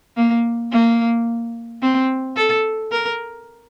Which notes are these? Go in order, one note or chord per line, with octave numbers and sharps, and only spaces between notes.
A#3
A#3
C4
A4
A#4